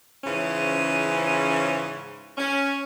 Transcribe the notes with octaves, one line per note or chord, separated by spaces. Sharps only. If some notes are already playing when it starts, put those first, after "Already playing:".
G#2 C#3 E3 F3 C#4
C#4